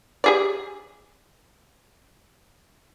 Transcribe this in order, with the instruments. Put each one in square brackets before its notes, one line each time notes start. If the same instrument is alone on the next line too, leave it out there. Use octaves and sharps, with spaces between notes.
[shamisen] G4 G#4 D5